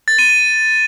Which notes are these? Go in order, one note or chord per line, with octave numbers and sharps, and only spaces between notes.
A6
D#7
D#7